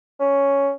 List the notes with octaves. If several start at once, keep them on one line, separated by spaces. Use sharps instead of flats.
C#4